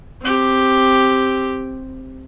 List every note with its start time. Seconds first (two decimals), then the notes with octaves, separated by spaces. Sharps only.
0.22 C4 G4